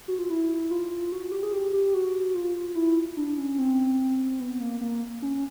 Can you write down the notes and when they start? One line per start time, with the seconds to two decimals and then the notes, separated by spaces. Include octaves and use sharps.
0.08 F#4
0.19 F4
0.30 E4
0.71 F4
1.12 F#4
1.32 G4
1.43 G#4
1.52 G4
1.73 G4
1.94 F#4
2.34 F4
2.75 E4
3.17 D4
3.38 C#4
3.58 C4
4.40 B3
4.60 A#3
4.81 A#3
5.22 C#4